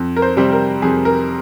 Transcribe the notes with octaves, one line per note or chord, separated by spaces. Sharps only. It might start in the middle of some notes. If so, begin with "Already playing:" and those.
Already playing: F2
A#4
C5
C3 G3 C4
A#4
F2 G#4
A#4